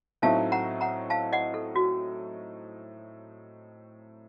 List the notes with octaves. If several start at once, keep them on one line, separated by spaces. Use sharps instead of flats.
A2 F#3 A3 C4 D#4 F5 A5
F#5 A#5
F#5 A#5
F5 A5
D#5 F#5
A4
F#4